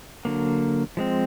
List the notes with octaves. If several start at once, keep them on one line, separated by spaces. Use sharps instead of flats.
D3 F#3 A#3
F3 G#3 C4